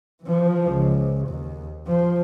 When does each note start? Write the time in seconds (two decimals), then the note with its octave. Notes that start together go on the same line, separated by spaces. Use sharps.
0.24 E3 F3
0.68 C#2
1.28 D#2
1.87 F3